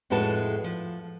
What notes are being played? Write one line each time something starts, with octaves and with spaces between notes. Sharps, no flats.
F2 A2 G#3 F#4 B4 A5
F3